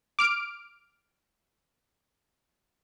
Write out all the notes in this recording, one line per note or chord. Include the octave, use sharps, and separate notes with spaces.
D6 F6 D7